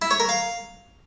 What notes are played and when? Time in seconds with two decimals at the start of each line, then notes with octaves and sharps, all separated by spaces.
0.02 E4
0.11 C#5
0.20 A#4
0.29 F5